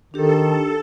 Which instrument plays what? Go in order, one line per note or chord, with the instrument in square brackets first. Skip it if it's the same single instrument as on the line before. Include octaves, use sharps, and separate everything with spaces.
[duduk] D#3 [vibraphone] D4 G4 [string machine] A4